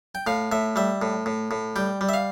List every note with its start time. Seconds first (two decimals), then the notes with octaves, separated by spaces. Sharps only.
0.15 G5
0.27 A2 F5
0.52 A2 E5
0.76 G3 E5
1.02 A2
1.26 A2
1.51 A2
1.76 G3 G5
2.01 G3
2.09 E5
2.13 F5